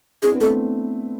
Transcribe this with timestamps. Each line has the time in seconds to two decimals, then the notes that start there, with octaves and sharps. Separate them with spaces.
0.23 C4 E4 G#4
0.31 B3 D4
0.41 A3 C4 A4